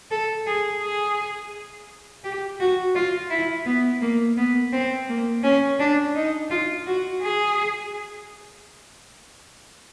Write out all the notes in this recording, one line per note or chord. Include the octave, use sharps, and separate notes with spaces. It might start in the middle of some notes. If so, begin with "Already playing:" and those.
A4
G#4
G#4
G4
F#4
F4
E4
B3
A#3
B3
C4
A#3
C#4
D4
D#4
F4
F#4
G#4